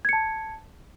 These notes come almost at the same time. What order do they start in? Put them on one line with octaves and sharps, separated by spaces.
G#6 C#7 A5